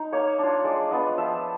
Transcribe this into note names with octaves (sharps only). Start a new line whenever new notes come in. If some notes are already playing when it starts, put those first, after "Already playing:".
Already playing: D#4
A#3 C#5
D4 F4
G#3 D5
B3 D4 F4 D#5
F3 E5